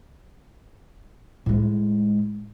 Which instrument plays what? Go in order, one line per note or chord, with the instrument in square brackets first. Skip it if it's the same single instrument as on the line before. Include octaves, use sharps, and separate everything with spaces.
[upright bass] A2 G#3